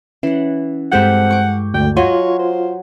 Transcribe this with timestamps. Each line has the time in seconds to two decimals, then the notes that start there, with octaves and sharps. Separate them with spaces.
0.23 E3 C#4 F#5
0.92 G2 G#3 C4 G4 A4 F#5 G6
1.31 C#6 D6
1.74 D2 G5
1.97 F#3 F4 C#5 D#5 G#5
2.39 C5